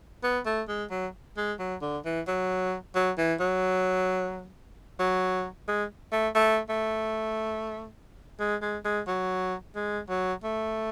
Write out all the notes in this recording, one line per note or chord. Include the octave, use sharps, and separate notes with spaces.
B3
A3
G#3
F#3
G#3
F#3
D3
E3
F#3
F#3
E3
F#3
F#3
G#3
A3
A3
A3
G#3
G#3
G#3
F#3
G#3
F#3
A3